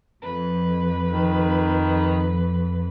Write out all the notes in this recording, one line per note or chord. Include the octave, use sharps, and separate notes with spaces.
F2 B4
D#3